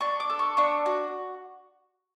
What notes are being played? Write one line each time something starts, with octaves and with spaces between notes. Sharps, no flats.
D4 C#6
D6
A4
C#6
D4 C#6
F#4